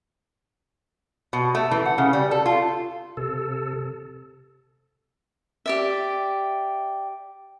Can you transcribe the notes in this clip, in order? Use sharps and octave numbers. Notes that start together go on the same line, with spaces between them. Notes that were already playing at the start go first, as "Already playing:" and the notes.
B2
A3
E3
F#5
C#3
G3
A4
F4
C3 A4
G4 D5 E5